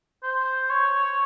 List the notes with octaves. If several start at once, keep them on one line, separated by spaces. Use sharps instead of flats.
C5
C#5